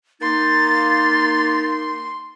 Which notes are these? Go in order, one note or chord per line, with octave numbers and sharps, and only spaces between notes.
A#3 D#4 C6 A6